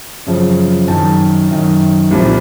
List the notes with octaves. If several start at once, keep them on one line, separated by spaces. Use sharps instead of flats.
F#2 C#3 F3
F#2 D#3 A5
F#2 D#3
C2 A#2 F3